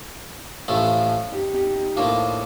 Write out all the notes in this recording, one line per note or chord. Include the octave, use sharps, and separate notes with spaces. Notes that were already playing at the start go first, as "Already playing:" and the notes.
Already playing: D#4
A1 A2 F3 A3
D#4 G4
D#4 G4
D#4 G4
A2 F3 A#3 D4 F4